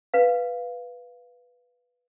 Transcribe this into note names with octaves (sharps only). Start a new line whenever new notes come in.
B4 F5